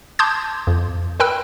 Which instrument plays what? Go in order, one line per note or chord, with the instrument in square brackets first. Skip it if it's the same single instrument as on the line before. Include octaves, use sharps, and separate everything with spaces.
[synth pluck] A5 C6 D6 D#6 G6 G#6
F2
A#4 B4 G5 B5 E6 F#6